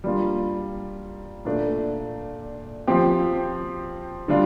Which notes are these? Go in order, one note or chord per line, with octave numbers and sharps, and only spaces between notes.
G3 A#3 D4 F4
A#2 A3 D4
F3 C4 G4
D3 G3 D4 F4